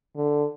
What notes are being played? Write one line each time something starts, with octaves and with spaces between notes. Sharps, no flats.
D3